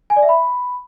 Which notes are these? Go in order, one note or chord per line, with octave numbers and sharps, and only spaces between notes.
G#5
D5
E5
B5